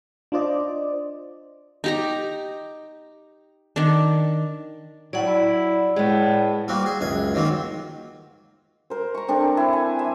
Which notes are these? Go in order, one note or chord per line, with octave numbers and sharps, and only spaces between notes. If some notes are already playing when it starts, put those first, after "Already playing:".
D4 F4 C5 D5 D#5
D#4 G4 A#5
D#3 D4
A2 F#3 D5 F#5
E4
A2 G#3 B3
G3 A#3 C4 F#4
G#4
C#2 F#2 G#5
D#3 F3 F#3 A#3 C4
A#4 C5
A#5 C#6
C4 D4 A4 A#4
E4
G#5
E5